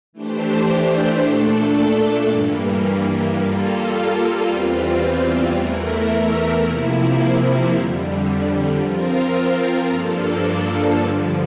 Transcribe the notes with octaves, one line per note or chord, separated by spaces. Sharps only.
E3 A3 D4 G4 C5
A#2 A3 D4 A4
G2 E3 G3 A#3
G3 A#3 F4 A4
E2 E3 G3 C4 F4
E2 E3 A3 E4 A#4
C3 F3 A#3 E4
F2 D3 G3
F3 C4 F4 A#4
G2 F3 A#3 D4 A4
G2 D3 F3